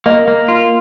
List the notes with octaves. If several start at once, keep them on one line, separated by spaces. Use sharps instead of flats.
A#3 D#5
A#3
F4